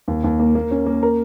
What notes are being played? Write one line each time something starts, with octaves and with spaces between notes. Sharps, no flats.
D#2
D#2
A#3
A#3
C#4
A#3
A#4